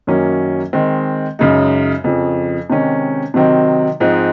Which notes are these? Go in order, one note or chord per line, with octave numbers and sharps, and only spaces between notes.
F#2 D#3 F#3 A#3 C#4
D#3 G#3 C4
F#2 C#3 G#3 D#4
F2 C#3 F3
C3 D#3 G#3 C#4
C3 D#3 F#3 C4 D#4
G#2 F3 G#3 C4 D#4